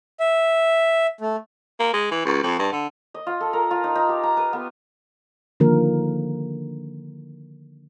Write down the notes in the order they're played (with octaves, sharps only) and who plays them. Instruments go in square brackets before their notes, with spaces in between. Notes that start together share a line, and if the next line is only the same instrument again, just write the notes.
[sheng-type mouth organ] E5
A3
[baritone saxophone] A#3
G#3
E3
C#2
F2
G2
D3
[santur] D#5
F4
A4
A#4
F4
D#4
D#4
G4
A#5
B4
B3
[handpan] D3 D#3 F3 A#3 A#4